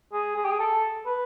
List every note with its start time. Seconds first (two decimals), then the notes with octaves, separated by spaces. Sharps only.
0.13 G#4
0.36 G#4
0.45 G4
0.52 G#4
0.59 A4
1.06 B4